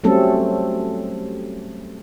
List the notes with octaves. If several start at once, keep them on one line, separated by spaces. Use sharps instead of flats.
F#3 G3 A3 C4 C#4 A4